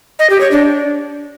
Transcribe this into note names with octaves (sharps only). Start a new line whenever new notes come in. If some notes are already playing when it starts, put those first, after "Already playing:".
D#5
G4
C#5
D4